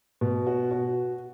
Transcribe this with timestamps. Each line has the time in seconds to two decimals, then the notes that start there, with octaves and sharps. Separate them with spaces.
0.21 B2
0.47 F#4
0.71 F#4